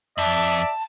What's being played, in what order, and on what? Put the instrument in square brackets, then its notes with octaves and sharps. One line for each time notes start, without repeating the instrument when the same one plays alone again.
[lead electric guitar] F2 [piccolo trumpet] D5 [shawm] E5 [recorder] A5